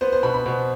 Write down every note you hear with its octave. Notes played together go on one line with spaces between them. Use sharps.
B3 C5
C5
B2 B5
B5
B2